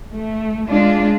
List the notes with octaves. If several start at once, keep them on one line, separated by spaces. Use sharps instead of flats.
A3
G#3 D4 F4